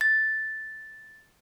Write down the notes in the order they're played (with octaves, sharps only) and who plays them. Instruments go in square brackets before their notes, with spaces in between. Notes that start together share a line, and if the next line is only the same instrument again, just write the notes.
[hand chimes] A6